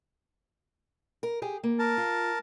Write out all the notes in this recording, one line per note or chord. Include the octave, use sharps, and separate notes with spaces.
A#4
G4 G#4
A#3
A#4 A5
F4